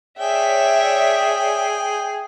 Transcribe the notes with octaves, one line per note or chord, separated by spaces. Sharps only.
G#4 C#5 D5 E5 G5